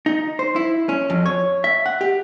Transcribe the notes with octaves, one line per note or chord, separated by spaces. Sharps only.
D#4
C5
E4
C#4
F2
C#5
E5
F#5
G4